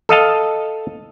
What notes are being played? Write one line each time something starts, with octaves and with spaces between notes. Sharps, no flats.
A4 D#5 F5 A5